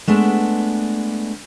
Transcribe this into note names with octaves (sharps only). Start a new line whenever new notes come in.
G#3 A3 B3 D4